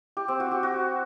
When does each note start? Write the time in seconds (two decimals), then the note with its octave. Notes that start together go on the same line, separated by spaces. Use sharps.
0.17 G4
0.28 C4
0.40 F#4
0.51 G4
0.63 F#4